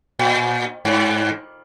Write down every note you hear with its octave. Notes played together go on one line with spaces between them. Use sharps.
A#2
G#2